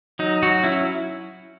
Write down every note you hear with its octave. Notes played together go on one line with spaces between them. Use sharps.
F#3 D#4
F#3 F#4
C#4 E4